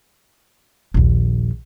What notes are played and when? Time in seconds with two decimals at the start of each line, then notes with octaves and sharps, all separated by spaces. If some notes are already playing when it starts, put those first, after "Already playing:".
0.94 A#1 D#2